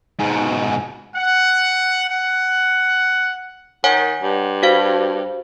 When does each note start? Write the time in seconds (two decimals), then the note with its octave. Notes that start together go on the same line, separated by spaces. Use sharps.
0.19 G#2 B2
1.16 F#5
2.10 F#5
3.84 D#3 C#5 F#5 G#5
4.22 G2
4.63 F#4 C5 F5